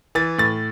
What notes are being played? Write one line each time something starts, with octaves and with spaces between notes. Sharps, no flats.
E3 A6
A2 A6